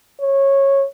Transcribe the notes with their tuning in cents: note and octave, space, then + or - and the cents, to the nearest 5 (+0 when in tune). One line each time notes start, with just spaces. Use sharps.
C#5 -15